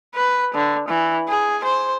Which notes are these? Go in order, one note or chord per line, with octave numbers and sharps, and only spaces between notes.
B4
D3
E3
G#4
C5